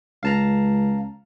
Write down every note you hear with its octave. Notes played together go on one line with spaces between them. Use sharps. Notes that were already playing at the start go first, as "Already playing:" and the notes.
C#2 F5 A5 A#5